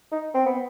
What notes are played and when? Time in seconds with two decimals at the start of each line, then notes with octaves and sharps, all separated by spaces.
0.12 D#4
0.34 C4
0.46 B3